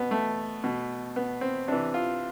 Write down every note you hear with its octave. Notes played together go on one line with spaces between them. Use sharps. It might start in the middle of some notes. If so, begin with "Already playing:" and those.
Already playing: B2 B3
A3
B2
B3
C4
C3 E3 D4
F4